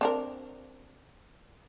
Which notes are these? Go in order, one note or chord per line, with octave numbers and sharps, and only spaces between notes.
C4 D4 A#4